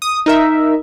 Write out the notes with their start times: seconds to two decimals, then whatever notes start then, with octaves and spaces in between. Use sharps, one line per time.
0.02 D#6
0.26 D#4 A#4 E5